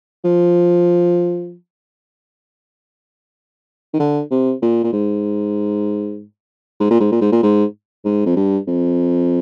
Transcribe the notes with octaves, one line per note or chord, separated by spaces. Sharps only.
F3
D#3
D3
C3
A#2
A#2
G#2
G#2
A#2
G#2
A#2
G#2
A#2
G#2
G#2
F2
G2
F2